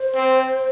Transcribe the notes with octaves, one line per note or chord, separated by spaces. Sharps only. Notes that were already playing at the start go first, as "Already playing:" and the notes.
Already playing: C5
C4